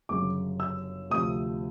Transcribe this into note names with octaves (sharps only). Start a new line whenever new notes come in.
G1 F#2 C#3 F#3 D6
E6
D2 C3 F3 D#6